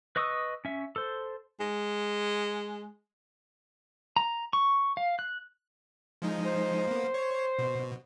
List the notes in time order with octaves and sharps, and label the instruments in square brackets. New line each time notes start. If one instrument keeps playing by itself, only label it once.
[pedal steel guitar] B4 D#5 C#6 D#6 E6
C#4 E5
A4 C5
[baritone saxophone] G#3
[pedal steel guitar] A#5
C#6
F5
F#6
[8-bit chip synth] F3 G#3 D#4
[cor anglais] C5
[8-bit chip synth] A#3 B3
C#5
B2